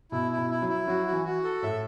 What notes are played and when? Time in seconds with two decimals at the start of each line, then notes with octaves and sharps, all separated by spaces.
0.12 B2 E4
0.31 E4
0.37 B2
0.50 E4
0.62 F#3
0.69 E4
0.87 F#3 F#4
1.06 F#4
1.13 E3
1.25 F#4
1.44 A4
1.62 A2 E5